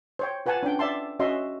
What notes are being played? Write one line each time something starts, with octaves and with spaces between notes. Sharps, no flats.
C5 C#5 G5
F4 B4 F#5 G#5 A5
C#4 D4 G5
D5 E5 A5 C6
C#4 F#4 D#5 E5 C6